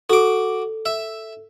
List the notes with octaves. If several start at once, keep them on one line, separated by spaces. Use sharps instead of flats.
F#4 A4 D6
E5